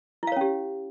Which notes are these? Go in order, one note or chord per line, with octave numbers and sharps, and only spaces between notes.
C#4 E4 G4 C#5 F5